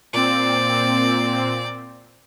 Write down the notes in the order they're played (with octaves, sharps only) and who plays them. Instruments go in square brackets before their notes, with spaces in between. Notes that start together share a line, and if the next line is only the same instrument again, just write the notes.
[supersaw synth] A#2 C4 [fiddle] D5